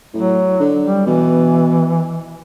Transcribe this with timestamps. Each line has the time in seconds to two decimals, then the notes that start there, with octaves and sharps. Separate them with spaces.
0.14 A2 F#3
0.60 D3
0.82 G3
1.07 B2 E3